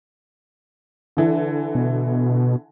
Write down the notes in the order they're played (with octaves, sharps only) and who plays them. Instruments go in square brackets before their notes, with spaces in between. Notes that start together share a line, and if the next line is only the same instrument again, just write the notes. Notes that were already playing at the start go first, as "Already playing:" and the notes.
[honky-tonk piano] D3 E3
[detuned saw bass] B2